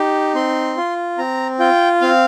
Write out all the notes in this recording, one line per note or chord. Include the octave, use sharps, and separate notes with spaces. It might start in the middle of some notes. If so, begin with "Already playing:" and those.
Already playing: D#4 G4
C4 C6
F4
C4 A#5
F4 G5
C4 F5